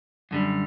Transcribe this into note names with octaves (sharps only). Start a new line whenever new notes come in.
F#2 D3 G3